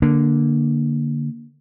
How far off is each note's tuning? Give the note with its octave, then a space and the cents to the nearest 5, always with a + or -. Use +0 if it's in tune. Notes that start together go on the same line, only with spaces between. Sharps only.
D3 +0 A#3 +5 D4 +0